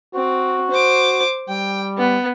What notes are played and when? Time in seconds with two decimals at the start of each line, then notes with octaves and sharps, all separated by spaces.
0.15 C4 F#4
0.71 C5 D6
1.49 G3 G5
1.98 B3